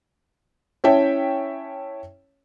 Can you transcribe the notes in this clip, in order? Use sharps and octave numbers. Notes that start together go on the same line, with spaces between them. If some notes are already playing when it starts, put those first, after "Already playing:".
C#4 E4 C#5 E5 G5 A5